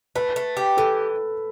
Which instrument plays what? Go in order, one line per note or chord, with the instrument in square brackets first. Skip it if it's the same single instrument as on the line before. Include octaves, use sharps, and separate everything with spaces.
[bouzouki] A3 [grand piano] B4
[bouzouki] A3
G4
[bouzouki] E3 [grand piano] A4